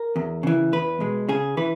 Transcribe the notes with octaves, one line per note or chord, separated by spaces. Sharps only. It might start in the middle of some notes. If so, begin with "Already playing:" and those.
Already playing: A#4
E2
C#3 E3
E2 B4
B2 G#3
C#3 G#4
E3 B4